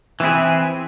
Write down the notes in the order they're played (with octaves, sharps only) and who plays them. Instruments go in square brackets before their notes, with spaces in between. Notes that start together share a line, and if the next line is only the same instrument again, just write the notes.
[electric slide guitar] E3 G3 C4 E4 G#4